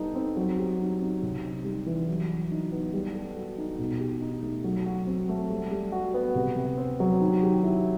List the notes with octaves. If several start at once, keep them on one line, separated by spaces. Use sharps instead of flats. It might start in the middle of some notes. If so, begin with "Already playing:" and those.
Already playing: G3 B3 D#4 A4
C4
F#3
G4
D#4
C4
C3
D#4
G3
E3
F#3
F#4
D#4
B3
G3
A4
F#4
D#4
B2
G4
D#4
A3
F#3
F#4
C4
A3
G3
G3
F#4
B3
C3
C3
C4
F#3
D#3
G4
E4